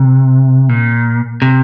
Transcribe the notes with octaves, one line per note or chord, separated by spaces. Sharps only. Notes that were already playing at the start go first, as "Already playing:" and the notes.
Already playing: C3
A#2
C3